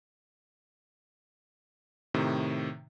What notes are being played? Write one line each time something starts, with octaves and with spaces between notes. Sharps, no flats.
A2 C3 D#3